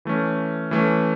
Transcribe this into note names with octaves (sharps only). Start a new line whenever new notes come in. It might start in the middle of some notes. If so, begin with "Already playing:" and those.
E3 A3 C#4
E3 A3 C#4